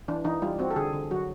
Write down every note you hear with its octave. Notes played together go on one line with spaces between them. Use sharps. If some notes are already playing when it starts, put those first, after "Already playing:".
E3 D4
E3 D#4
G3 F4
C4 F#4
A4
D3 G#4
D3
F#3 F#4